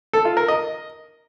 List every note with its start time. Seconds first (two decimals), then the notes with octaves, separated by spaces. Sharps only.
0.13 A4
0.25 F4
0.37 A#4
0.48 D#5